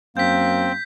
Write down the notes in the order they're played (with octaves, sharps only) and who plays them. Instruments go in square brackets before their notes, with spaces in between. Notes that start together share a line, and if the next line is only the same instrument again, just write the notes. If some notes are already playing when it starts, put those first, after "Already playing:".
[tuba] F#2 [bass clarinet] A#3 [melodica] C4 [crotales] G6 B6